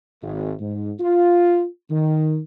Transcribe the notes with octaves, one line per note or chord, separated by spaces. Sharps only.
G#1
G#2
F4
D#3